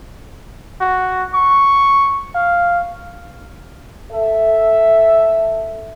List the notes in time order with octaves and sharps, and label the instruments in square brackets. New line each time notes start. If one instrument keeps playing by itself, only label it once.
[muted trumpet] F#4
C#6
F5
[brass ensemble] A4 E5